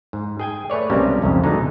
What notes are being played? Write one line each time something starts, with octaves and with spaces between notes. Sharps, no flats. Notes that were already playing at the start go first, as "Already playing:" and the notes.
G#2
G#4 G5 G#5
A3 B4 C#5 D5
B1 C3 G3 G#3 A#3 C#4
C2 F2 G#2 C#3
B2 D3 G#3 D#4